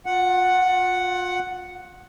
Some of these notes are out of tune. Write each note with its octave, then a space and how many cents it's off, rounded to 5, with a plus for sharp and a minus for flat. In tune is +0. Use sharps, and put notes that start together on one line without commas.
F4 +35 F#5 +0